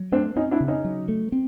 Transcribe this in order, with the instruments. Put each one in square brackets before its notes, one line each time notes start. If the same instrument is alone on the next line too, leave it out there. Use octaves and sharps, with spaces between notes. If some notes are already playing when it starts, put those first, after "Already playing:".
Already playing: [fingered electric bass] F#3
[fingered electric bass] A3 [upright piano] C4 D4
[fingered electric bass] C4 [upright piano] C#4 D#4
[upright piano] D4 E4
[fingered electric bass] C#3
[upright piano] C#4 D#4
[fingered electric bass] F#3
A3
C4